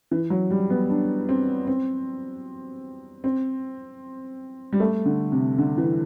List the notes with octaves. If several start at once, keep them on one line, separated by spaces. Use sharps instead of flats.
E3
F#3
G3
B3
D4
C4
C4
C4
G3
A3
D3
C3
D3
E3